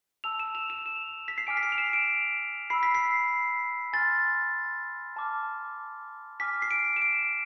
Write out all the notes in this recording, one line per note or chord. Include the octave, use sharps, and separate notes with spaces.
A5 E6 F7
E7
F7
E7
E7
B6
C7
G#5 D6 F6 D7
B6
C7
F7
E7
D7
B5 E6 C7
B6
C7
G#5 C6 F6 A6
A5 D6 F6
G#5 D6 F6 B6
C7
D7
E7
D7